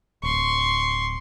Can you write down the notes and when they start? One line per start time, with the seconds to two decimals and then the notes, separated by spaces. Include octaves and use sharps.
0.23 D1 C6 C#6